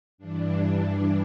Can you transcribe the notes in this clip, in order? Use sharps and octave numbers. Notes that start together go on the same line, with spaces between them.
G2 E3 D4